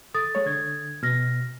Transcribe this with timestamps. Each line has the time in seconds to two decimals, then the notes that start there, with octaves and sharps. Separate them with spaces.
0.14 A4 D#6 A6
0.35 G#3 C#5
0.46 D3 G#6
1.03 B2 F6 A#6